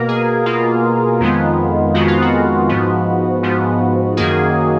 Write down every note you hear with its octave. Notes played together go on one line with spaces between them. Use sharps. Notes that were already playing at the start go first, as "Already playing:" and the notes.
Already playing: B2 A#3 A#4
G#4
B2 A#3 F4
F2 D#3 G#3 B3
F2 D#3 G#3 B3 F#4
F4
F#4
G#2 F3 B3
G#2 F3 B3
F#2 D#3 A#3 G#4